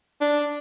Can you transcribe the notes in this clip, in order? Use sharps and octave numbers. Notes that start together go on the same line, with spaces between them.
D4